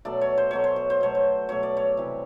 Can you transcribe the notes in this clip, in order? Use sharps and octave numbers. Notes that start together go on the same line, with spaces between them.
B2 F#3 A3 D5
C#5
C5
B2 F#3 A3 C#5
C5
C#5
C5
B2 F#3 A3 C#5
C5
B2 F#3 A3 C#5
D5
C#5
C3 E3 G3